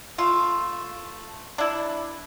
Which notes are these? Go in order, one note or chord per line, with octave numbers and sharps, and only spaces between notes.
A3 F4
D4 E4